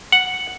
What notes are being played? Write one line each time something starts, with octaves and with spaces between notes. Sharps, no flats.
F#5